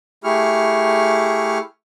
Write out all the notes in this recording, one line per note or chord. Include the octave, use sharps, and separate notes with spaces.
A3 E4 G4 G#4 C#6 F6